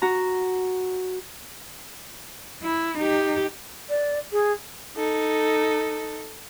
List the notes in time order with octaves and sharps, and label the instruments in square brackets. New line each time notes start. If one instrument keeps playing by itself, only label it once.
[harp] F#4 A#5
[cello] E4
D#4 G4
[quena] D5
G#4
[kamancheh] D#4 A4